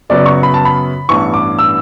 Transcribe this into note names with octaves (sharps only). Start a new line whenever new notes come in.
F#2 C#3 F#3 B3 D5
C#6
B5
A5
B5
A1 G2 E3 B3 E4 C#6
D6
E6